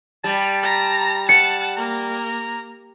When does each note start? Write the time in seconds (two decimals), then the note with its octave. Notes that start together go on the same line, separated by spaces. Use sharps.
0.24 G3 A5
0.63 A#5
1.29 F#5 A5 C#7
1.77 A#3 A#5